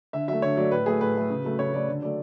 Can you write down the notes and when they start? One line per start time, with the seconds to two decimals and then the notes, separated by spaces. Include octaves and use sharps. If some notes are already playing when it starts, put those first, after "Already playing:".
0.13 D3 E5
0.28 F#3 A3 E5
0.42 D3 C#5
0.57 F#3 A3 D5
0.71 A2 B4
0.86 F#3 A3 G#4
1.00 A2 B4
1.15 F#3 A3
1.30 C#3
1.44 F#3 A3
1.59 C#3 C#5
1.74 F#3 A3 D5
1.88 D3
2.02 F#3 A3 D5